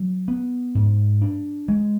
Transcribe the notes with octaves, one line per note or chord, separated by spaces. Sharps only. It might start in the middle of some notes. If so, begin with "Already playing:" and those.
Already playing: F#3
B3
G#2
D4
G#3